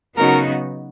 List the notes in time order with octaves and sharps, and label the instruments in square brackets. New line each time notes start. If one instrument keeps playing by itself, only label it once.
[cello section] C#3 F#3 B3 D#4 F#4 [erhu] A#4